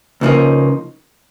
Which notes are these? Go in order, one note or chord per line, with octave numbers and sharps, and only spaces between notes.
C#2 C#3 F3 A#3 D#4